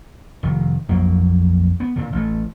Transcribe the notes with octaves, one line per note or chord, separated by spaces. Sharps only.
F1 D#3
A#1 F2 F#3 A#3
B3
A#2 D3
A1 A3